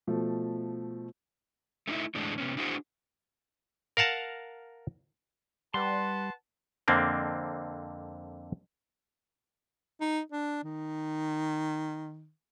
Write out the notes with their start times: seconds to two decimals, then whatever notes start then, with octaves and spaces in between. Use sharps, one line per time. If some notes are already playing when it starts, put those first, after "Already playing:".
0.07 B2 F3 A3
1.87 A3 C#4 D#4 E4 E5
2.15 E2 A2 D3 G#3 D4
2.38 C3 B3 C#4
2.57 D4 E4 F#4 G#4 C5
3.97 A#4 F5 F#5 A5 A#5
5.74 G3 B4 F#5 A5 C6
6.88 F2 D3 A#3 C4 D4
10.01 D#4
10.32 D4
10.64 D#3